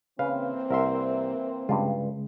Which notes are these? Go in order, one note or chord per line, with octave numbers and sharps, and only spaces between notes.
C#3 E3 A#3 C4 B4 F5
C2 A#4 E5 C6
G2 C#3 G#3 F4